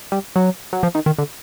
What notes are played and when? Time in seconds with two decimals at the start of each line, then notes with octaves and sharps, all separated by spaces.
0.12 G3
0.36 F#3
0.73 F#3
0.83 F3
0.95 D#3
1.06 D#3
1.18 D3